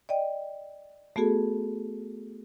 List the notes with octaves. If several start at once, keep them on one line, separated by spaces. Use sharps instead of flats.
D5 D#5 G5
A3 B3 F#4 G#4 A4